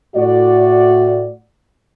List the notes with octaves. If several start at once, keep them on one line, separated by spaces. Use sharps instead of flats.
A2 F#4 D5